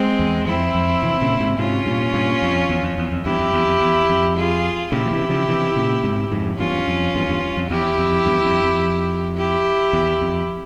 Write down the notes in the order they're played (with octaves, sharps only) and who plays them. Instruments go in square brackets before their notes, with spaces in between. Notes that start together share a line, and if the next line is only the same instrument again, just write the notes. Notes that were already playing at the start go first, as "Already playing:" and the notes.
Already playing: [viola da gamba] G#3 C4
[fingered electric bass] E2
[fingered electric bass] F2 [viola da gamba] C4 E4
[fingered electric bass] F2
C3 E3
A#2 C#3
G#2 C3
[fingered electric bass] G#2 C3 [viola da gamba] C#4 F4
[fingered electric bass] G2 A#2
G2 A#2
F2
E2
F2
E2
F2
[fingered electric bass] E2 G2 [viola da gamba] E4 G4
[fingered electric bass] F2
E2
F2
E2
F2
[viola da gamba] F4 G#4
[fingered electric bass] A#2 C#3 [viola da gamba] E4 G4
[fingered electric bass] F3
C3 E3
C#3 F3
C3 E3
A#2 C#3
G#2 C3
F2 G#2
[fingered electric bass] E2 G2 [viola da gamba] C#4 F4
[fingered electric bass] F2
E2 G2
E2 G2
F2
[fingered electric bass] E2 [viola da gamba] E4 G4
[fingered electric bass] F2
E2 G2
F2
F2
[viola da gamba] E4 G4
[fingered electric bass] E2
F2